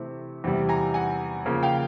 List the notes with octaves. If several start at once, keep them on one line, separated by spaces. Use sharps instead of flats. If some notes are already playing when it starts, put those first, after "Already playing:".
Already playing: C3 E3 A3 C4
E2 C3 E3 G3
G#5 A#5
F#5 G#5
C#3 F3 A#3
F5 G5